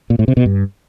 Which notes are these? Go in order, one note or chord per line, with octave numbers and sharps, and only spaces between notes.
A#2
A2
C3
B2
G2